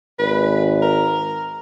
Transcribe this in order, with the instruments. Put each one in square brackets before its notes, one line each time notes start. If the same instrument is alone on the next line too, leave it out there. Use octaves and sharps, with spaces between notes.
[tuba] G#1 [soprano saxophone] B4
[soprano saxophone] A#4